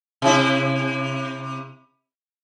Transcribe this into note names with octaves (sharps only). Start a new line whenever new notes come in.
C3 E4